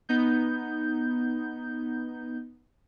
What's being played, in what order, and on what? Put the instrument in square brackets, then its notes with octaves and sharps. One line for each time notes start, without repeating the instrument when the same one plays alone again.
[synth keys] B3 D#4 G6